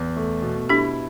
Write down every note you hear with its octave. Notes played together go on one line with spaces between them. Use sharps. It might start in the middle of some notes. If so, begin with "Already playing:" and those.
Already playing: E2
A3
B2
D4 E4 G4